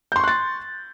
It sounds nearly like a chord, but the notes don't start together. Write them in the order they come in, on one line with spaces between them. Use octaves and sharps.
G6 C6 C#6 F#6 A6